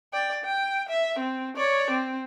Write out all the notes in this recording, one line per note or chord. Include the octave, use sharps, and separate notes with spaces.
D5 G5
G5
E5
C4
C#5 D5
C4